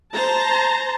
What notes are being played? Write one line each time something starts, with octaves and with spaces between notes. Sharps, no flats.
C5 A5 A#5